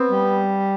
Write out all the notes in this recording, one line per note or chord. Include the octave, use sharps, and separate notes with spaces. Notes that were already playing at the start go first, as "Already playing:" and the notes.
Already playing: B3 C4
G3